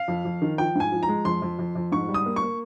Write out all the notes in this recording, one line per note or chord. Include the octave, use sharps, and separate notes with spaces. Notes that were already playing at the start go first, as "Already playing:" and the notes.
Already playing: F5
F2
F2
D#3
F3 G5
G#2 G#5
F3
A#5
G#3
F2 C6
F2
F2
F2
G#2 C#6
G3
D#6
A#3
C#6
A#3